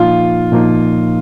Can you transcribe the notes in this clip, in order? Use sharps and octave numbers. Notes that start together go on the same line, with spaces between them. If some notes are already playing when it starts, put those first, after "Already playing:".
Already playing: A#2 F3 A#3 D#4 F4
A#2 F3 A#3 D#4